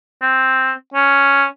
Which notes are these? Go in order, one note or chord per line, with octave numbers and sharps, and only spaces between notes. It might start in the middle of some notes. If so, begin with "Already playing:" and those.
C4
C#4